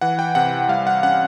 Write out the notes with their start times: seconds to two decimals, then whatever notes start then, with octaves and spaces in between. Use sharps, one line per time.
0.01 E3 F#5
0.19 G5
0.35 C3 F#5
0.69 G3 F5
0.87 F#5
1.03 C#4 F#5